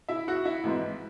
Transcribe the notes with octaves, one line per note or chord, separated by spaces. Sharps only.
E4 E5
F#4 F#5
E4 E5
G#1 G#2 E3 G#3